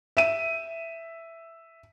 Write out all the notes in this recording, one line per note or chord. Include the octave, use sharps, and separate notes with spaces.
E5 D#7